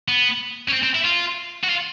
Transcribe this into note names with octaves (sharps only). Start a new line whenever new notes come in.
B3
C#4
C4
C4
E4
F4
F#4
F4